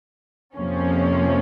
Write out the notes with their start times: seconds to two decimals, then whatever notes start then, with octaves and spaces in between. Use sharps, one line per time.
0.56 F2 C3 F3 A#3 C#4